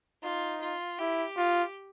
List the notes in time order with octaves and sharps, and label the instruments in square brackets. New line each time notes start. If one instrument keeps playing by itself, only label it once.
[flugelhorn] D#4 [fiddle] F4
[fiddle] F4
[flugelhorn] E4 [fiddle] G4
[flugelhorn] F4